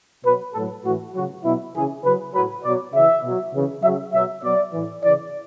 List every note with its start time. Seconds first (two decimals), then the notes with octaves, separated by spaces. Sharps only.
0.24 B2 F#3 B4
0.54 A2 F#3 A4
0.84 A2 E3 F#4
1.14 C#3 F#3 F#4
1.44 B2 F#3 E4
1.75 C#3 E3 G#4
2.04 C#3 F#3 B4
2.34 A2 F#3 B4
2.63 B2 F#3 D5
2.93 C#3 E3 E5
3.23 B2 F#3
3.54 C#3 E3
3.83 F#3 E5
3.87 C#3
4.14 B2 F#3 E5
4.42 B2 F#3 D5
4.72 A2 E3
5.03 C#3 E3 D5